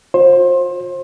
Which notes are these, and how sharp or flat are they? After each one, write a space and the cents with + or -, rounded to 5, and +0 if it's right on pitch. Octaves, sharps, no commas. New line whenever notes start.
F4 +40 C5 +25